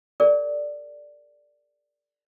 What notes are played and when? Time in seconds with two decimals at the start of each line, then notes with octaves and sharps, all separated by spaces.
0.20 G#4 A#4 D5